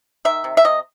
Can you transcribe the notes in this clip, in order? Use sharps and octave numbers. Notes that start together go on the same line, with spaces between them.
D#3 E5
C3
E5
C3 D#5